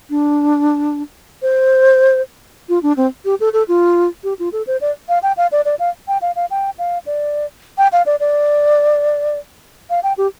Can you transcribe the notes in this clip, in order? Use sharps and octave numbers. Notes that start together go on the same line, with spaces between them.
D4
C5
F4
D4
C4
G4
A4
A4
F4
G4
F4
A4
C5
D5
F5
G5
F5
D5
D5
F5
G5
F5
F5
G5
F5
D5
G5
F5
D5
D5
F5
G5
G4